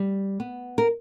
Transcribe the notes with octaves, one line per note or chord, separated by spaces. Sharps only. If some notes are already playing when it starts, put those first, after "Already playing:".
Already playing: G3
B3
A#4